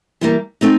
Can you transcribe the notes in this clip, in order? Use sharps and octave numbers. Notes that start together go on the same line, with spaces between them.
E3 G3 A#3
A3 C4 D#4